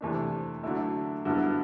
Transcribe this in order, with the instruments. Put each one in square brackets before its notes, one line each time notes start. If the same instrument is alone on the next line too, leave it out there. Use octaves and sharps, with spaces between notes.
[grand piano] C3 E3 A3 D4
D3 F#3 A3 E4
G2 D3 F#3 B3 E4